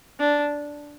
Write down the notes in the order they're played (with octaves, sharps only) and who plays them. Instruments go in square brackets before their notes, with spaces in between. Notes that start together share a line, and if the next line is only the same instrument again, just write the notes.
[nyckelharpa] D4